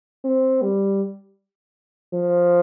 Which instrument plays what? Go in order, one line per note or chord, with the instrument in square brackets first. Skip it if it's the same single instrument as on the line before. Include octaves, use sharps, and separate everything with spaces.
[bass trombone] C4
G3
F3